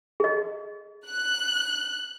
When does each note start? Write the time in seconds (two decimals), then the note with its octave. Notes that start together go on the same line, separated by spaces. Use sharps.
0.20 G#4 D#5
1.07 F#6